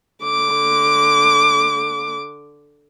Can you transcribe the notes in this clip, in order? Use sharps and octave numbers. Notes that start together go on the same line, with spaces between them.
D3 D6